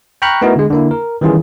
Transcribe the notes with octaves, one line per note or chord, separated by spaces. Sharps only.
G5 A#5 B5 C#6 F6 F#6
A3 B3 D#4 E4 F#4 A#4
D3 G#3
D3 A#3 E4
A#4
D#3 E3 G3 C#4 F4 G#4